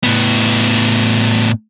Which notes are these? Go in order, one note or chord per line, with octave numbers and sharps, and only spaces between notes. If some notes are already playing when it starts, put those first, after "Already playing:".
A2 B3